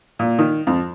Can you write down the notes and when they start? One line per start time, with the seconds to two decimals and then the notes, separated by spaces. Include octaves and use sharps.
0.19 A#2
0.39 D#3
0.67 F2